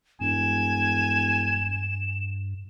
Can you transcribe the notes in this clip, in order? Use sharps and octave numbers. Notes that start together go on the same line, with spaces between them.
E1 G2 G#5 E7